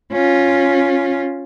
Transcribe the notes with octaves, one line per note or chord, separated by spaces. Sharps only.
C#4 F4